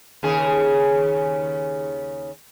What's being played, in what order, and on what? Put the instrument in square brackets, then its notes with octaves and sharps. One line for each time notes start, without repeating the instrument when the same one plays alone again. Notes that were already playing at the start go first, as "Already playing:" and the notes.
[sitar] D#2 C#3 G#4